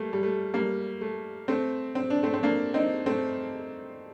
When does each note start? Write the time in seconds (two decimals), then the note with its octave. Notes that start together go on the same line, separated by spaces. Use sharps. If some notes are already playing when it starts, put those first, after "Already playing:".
Already playing: G3 A3 A#3
0.13 G3
0.23 A3
0.54 G3 A#3
1.01 A3
1.48 A3 C4
1.95 C4
2.10 D4
2.23 A3 C4
2.34 C4
2.43 A#3 D4
2.74 C4 D#4
3.06 A3 C4